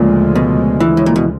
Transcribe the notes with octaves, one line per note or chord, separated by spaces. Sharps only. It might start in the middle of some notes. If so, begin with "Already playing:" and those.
Already playing: D2 A#2 C#3 F3 G#3
B2
E3
A2
A#2
B2